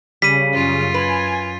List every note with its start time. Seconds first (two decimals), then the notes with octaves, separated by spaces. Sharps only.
0.22 C#3 G3 B6 D#7
0.53 F#2 F4
0.94 B4 G#5